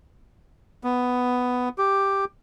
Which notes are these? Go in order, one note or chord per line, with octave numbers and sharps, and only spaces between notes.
B3
G4